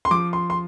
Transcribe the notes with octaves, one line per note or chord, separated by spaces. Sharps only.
C6
F3 D6
C6
C6